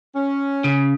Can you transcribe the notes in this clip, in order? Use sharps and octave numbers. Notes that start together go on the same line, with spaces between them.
C#4
C#3